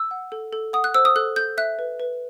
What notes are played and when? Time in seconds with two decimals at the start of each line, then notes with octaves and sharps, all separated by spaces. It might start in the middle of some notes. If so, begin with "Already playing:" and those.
Already playing: E6
0.11 F#5
0.32 A4
0.53 A4
0.73 F#5 D#6
0.84 F#6
0.94 C5 E6
1.05 D#6
1.16 A4 F#6
1.36 A4 G6
1.58 E5 F#6
1.79 B4
2.00 B4